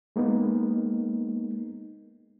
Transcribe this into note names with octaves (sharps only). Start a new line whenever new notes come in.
G#3 A#3 B3 D#4